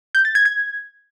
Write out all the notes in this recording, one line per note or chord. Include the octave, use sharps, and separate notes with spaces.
G6
A6
G#6
G#6